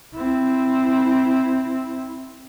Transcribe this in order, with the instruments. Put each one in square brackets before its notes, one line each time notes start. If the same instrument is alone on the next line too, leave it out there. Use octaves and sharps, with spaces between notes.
[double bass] C4 E4